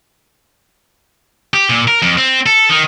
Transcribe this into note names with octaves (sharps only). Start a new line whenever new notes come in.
G4
A#2
A#4
F2
C4
A4
D#3